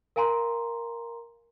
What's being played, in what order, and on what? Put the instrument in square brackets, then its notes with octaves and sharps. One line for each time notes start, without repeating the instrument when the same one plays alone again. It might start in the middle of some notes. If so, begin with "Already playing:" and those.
[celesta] A#4 F5 G#5 A#5 C6